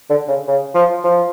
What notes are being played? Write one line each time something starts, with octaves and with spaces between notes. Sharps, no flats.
D3
C#3
C#3
F3
F3